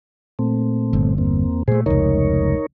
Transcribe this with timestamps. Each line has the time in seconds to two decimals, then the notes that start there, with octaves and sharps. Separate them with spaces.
0.39 A#2 A3 C4
0.93 G1
1.18 E2 A#3 C4
1.68 A#2 A3 G#4 C5
1.86 F1 C#2 D#4 A#4 C#5